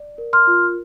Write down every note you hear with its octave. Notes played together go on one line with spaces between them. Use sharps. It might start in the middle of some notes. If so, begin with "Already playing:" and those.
Already playing: D5
A#4
C6 F6
F4